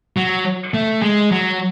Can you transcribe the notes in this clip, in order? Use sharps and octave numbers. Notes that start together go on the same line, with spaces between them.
F#3
A3
G#3
F#3